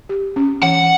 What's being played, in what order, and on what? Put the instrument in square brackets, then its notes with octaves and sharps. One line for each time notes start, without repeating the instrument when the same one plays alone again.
[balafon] G4
C#4
[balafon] E3 [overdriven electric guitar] F#5